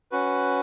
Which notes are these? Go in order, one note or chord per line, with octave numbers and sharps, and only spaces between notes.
C#4 F#4 B4